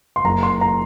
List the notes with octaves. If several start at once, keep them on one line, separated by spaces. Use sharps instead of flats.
C6
F#1 A#5
C6
A#5